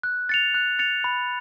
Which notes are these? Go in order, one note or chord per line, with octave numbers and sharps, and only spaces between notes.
F#6
A6 C#7 F7
F#6
A6 C#7 F7
B5